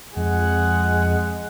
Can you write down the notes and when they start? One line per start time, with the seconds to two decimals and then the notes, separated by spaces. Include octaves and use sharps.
0.17 F2 G#3 G#4 F#5